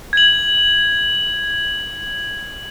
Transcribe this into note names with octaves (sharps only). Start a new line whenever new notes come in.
G#6 F#7